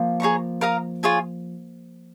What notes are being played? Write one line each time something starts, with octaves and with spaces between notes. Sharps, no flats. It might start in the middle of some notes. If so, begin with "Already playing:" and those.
Already playing: F3 A#3
G#4 C#5 A#5 C#6
A#4 F5 A#5 D#6
F4 G#4 C#5 G#5